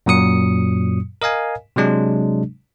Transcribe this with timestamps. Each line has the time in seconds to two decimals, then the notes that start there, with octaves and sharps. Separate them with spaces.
0.06 F#2 A#2 F#3 D#6 C#7
1.22 A#4 D#5 F5 G#5
1.76 C3 F#3 G#3 D4